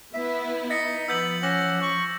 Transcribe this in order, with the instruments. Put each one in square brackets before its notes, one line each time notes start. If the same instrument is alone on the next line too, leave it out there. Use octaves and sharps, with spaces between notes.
[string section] B3 E4 [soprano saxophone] E5
[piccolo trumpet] D#4 [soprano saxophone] D#5 [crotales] A6 B6 C#7
[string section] F3 [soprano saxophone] B3 [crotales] E6 G6 F#7
[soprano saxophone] C#4 [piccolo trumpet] F#5 [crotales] D6 F6 A#6
[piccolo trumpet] C#6